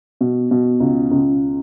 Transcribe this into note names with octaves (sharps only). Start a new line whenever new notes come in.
B2
B2
C#2
C#2